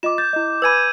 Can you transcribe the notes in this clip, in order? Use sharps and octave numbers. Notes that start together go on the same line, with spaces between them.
F4 D#5 D6 E7
G6 A6
E4 D#5
B4 G#5 B5 E6 G#6 D#7